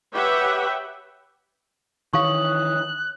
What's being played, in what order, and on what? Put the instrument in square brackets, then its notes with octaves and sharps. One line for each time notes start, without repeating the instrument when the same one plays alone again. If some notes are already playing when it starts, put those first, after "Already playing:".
[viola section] G4 B4 C#5 E5 F#5 G5
[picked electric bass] D#3 E3 [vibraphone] C#5 D#6 [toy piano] F5 C#6 [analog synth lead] F#6